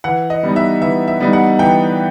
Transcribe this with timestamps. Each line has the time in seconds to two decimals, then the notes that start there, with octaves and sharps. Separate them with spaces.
0.04 E3 F#5
0.30 D#5
0.43 G3 B3 D#4
0.56 E5
0.81 E3 E5
1.08 E5
1.20 G3 B3 D#4
1.33 F#5
1.59 E3 G5